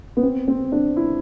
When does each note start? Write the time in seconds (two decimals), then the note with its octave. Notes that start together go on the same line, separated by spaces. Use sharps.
0.17 B3
0.23 C4
0.48 C4
0.72 D4
0.97 E4